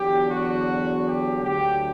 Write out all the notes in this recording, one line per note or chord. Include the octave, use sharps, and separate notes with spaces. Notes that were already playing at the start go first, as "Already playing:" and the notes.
Already playing: E2 D3 F#3 G4
F#4
G4
D2 D3 F#3 G4